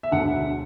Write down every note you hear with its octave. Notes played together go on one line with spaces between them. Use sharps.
E5
E1 D2 D3 F#5